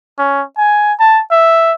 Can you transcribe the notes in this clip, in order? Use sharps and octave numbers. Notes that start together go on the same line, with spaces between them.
C#4
G#5
A5
E5